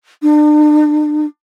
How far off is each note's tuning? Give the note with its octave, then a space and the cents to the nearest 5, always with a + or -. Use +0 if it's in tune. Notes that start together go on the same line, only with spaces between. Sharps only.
D4 +40